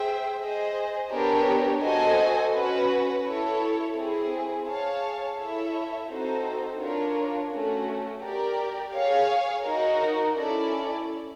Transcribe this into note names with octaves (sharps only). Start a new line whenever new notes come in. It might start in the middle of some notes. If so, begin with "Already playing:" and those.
Already playing: G#4 C5 E5 G5
G#4 C5 D#5
B3 D4 G4 A#4 C#5
F#4 A4 C5 D#5 G#5
C#4 F#4 B4
E4 A4 C#5
C4 E4 G#4
G#4 C#5 F5 A5
E4 A4 C#5 E5
C4 D#4 F#4 A4 C5
D4 F4 A#4 C#5
A3 C#4 F#4
G4 A#4 D5
G#4 C#5 F5
D#4 F#4 A#4
C#4 E4 A4 D5